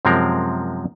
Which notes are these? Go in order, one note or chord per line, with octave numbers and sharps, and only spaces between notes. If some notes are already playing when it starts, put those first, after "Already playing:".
F#2 C3 F3 G#3 C4 A#4